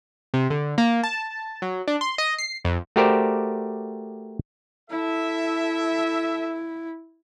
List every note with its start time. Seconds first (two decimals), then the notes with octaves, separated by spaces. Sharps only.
0.34 C3
0.50 D3
0.78 A#3
1.03 A5
1.62 F#3
1.88 D4
2.01 C6
2.18 D#5
2.38 C7
2.65 F2
2.96 A3 F#4 G4 A#4 C5 D5
4.90 E4 A4 E5